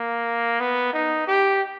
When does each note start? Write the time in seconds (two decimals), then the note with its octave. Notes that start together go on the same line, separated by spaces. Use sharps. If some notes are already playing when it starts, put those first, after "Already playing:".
Already playing: A#3
0.60 B3
0.93 D#4
1.27 G4